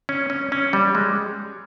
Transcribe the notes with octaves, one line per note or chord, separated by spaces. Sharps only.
C#4
C#4
C#4
G3
G#3